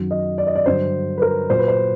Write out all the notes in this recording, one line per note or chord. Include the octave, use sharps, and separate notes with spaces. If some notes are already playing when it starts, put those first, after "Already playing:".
Already playing: F#2 D#3 F#3
D#5
D5
D#5
D5
G2 D3 F#3 C5
B4
A#4
A#2 F#3 C5
B4
C5